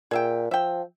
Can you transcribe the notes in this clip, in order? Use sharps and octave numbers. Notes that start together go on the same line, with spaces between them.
A#2 G#4 E5 G5
F3 E5 G5